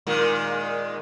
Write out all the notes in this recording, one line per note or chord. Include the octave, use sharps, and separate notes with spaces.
A#2 D#3 G#3